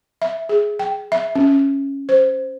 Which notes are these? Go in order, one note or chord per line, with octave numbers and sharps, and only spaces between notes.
E5
G#4
G5
E5
C#4
C5